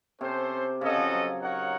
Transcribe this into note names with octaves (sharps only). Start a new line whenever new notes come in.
C3 C#4 A4 C5
C#3 C#4 A4 D#5 F#5
F3
F#3
D#4 A#4 C#5 F#5